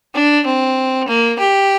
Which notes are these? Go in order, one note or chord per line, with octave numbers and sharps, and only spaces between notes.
D4
C4
A#3
G4